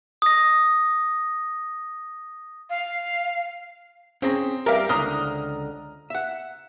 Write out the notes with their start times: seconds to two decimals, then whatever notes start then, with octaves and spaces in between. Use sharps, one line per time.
0.22 D#6 A#6
2.70 F5
4.22 C4 C#4 G#4 A#5
4.66 G3 G4 A#4 E5 F5
4.89 C#2 D3 C5 A#5 D#6 F6
6.10 E5 F#5